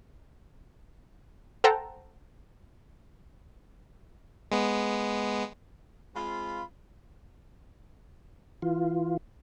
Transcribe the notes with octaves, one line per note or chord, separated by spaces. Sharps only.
A4 C5 F#5 G5 A5 A#5
G#3 B3
G#3 C4 F4 B5
E3 F4